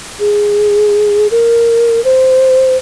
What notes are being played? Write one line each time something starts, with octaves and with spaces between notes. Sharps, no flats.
G#4
A#4
C5